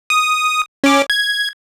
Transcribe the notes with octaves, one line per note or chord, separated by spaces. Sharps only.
D#6
C#4 D6
G#6